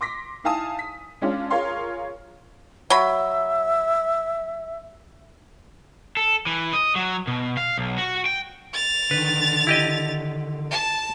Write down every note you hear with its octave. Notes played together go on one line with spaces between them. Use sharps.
C6 D6 A#6 B6
D#4 E4 F5 G#5 A5 D#6
B6
G#3 C#4 D4 F4
F4 G#4 A#4 C#5 F5 C6
F#3 E5 B5
A4
E3
D#5
F#3
B2
F5
B1
F#4
G5
A6 F7
D3 D#3 B4
E4 G4 D#5
A5